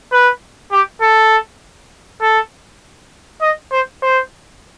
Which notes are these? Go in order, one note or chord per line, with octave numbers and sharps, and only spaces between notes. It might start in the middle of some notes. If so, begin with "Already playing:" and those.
B4
G4
A4
A4
D#5
C5
C5